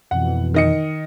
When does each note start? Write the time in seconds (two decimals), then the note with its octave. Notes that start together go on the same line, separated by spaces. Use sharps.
0.11 F2 B2 E3 F#5
0.54 D#3 D#5 C#7